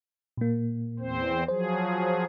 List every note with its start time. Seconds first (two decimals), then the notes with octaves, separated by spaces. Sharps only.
0.37 A#2 A#3
0.99 E2 C4 C5
1.48 F3 F#3 G#4 C5